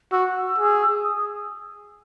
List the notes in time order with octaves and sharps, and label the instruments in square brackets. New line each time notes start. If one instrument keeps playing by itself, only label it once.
[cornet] F#4 [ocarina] E6
[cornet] G#4
[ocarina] D#6